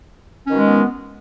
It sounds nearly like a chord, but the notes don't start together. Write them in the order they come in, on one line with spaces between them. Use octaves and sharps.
C#4 D#3 B2 G#3 B3